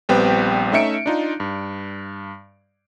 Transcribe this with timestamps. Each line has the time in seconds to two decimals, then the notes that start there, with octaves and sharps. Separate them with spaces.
0.09 A#1 G3 B3 C4 B4 G5
0.72 A3 C#4 D#4 E5 C#7 D7
1.06 D4 D#4 F4
1.40 G2